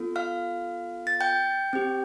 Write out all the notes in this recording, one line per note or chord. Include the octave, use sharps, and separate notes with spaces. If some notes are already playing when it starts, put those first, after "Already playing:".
Already playing: B3 F4 A4
F5 F6
A6
G5 G6
C4 G4